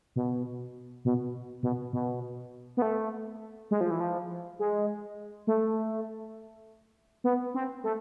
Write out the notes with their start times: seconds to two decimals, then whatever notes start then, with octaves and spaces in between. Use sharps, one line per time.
0.16 B2
1.05 B2
1.63 B2
1.93 B2
2.77 B3
2.82 A3
3.71 G#3
3.81 F3
3.91 E3
4.00 F3
4.59 G#3
5.47 A3
7.24 B3
7.54 C4
7.84 A3